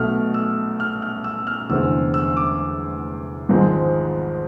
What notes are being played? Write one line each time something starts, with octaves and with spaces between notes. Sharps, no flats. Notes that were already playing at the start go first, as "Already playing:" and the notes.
Already playing: B1 B2 A3 F6
E6
F6
F6
E6
F6
F1 E2 D3 G#3 C4 E6
E6
D6
G#1 G#2 F3 G#3 C4